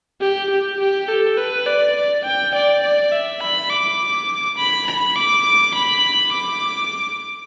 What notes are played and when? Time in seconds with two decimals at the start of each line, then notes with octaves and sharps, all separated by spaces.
0.21 G4
0.50 G4
0.80 G4
1.08 A4
1.37 B4
1.66 D5
1.96 D5
2.24 G5
2.54 D5
2.83 D5
3.12 E5
3.41 B5
3.70 D6
4.57 B5
4.87 B5
5.16 D6
5.74 B5
6.32 D6